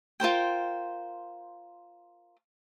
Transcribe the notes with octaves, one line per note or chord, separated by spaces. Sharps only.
F4 A#4 C5 G5